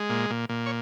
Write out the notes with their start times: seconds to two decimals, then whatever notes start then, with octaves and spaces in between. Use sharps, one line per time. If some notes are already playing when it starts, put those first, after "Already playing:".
Already playing: G#3
0.09 A#2
0.30 A#2
0.49 A#2
0.66 C#5